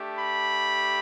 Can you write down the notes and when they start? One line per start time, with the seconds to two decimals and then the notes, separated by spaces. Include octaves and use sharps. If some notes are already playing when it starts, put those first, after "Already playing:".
Already playing: A3 D4 G4
0.19 B5